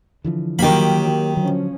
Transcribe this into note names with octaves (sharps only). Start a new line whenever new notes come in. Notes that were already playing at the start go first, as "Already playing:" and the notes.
D3 E3 F3
D#3 F#3 A#3 G4 B5
D3 F3 F#3 C#4